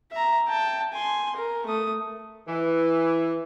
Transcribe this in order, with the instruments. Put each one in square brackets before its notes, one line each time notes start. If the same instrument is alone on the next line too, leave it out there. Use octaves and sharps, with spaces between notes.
[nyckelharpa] E5 A#5
G5 A5
G#5 C6
A#4
A3 D#6
[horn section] E3